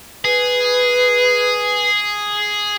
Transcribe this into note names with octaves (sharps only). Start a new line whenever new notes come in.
G#4 B4